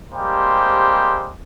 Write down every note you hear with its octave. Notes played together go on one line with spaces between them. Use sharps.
G3 G#3 A#3 C4 G4 C5